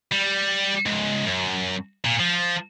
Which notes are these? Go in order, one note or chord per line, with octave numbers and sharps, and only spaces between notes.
G3
C#2 G#2
F#2
A#2
F3